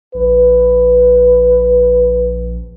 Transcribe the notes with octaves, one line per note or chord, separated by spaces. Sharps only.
A#1 B4